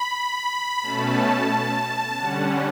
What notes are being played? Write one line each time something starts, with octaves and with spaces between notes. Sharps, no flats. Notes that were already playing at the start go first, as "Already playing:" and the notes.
Already playing: B5
B2 A3 C#4 A5
D3 G3 C#4 F#5